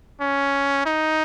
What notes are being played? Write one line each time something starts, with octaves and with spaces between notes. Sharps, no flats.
C#4
D#4